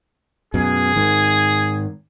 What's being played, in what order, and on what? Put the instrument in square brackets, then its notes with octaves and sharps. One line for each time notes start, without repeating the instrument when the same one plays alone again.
[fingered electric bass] F#2 B2 [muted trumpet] G#4
[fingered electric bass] G#2 D#3